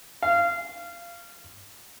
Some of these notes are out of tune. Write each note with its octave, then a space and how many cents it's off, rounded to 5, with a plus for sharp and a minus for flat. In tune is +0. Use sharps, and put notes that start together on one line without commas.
F5 -20